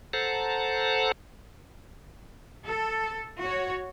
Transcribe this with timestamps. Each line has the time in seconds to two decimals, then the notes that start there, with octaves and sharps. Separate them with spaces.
0.13 A4 C5 F#5 A5 A#5
2.67 A4
3.39 F#4 C#5